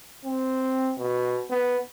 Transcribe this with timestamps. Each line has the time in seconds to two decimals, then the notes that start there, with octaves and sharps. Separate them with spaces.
0.25 C4
0.99 B2
1.50 B3